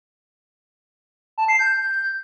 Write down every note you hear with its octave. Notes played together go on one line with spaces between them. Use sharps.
A5
C7
G6